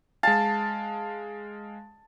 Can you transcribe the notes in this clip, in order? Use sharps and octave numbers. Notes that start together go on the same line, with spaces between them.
G#3 F5 A5